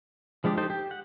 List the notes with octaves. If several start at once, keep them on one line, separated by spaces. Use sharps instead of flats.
F3 G#3 D4 G4
D#4 G4 A4 C5 G5
G4
F#5